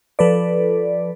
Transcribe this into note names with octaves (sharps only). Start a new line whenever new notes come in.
F3 A4 B4 D5